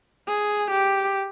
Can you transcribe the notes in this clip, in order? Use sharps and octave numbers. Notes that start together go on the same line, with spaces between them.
G#4
G4